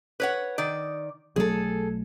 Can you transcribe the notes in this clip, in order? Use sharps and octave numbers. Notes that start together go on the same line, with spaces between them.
B4 C#5 F#5
D#3 D5
B1 F#3 A3 G#4 A4